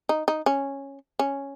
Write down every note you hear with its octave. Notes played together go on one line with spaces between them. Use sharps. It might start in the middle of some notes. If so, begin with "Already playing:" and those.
D#4
D#4
C#4
C#4